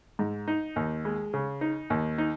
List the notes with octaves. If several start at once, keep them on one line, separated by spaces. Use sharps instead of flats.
G#2
D#4
D#2
G#3
C#3
D#4
D#2
D#4